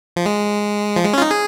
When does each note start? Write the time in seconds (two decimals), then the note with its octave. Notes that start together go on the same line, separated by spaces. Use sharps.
0.16 F3
0.26 G#3
0.96 F3
1.04 G#3
1.13 C#4 F4
1.22 D#4
1.31 G#4